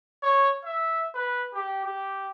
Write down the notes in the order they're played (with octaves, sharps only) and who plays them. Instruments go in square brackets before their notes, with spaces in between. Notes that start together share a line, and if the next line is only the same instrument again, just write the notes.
[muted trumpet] C#5
E5
B4
G4
G4